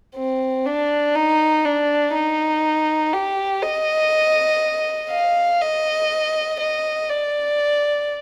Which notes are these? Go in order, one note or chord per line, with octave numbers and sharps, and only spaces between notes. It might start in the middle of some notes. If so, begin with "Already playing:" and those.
C4
D4
D#4
D4
D#4
G4
D#5
F5
D#5
D#5
D5